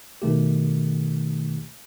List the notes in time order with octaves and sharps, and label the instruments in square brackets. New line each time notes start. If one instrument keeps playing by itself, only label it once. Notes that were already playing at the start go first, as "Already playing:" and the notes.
[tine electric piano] B2 D#3 A3 G4